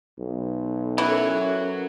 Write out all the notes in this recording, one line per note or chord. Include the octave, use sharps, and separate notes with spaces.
B1
E3 F#3 C#4 F#4 A4 A#4